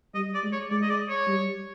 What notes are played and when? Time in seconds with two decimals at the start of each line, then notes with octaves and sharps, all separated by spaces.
0.15 G3 D#5
0.34 D5
0.44 G#3
0.52 C#5
0.71 G#3 D5
0.82 D#5
0.90 D5
1.10 C#5
1.28 G3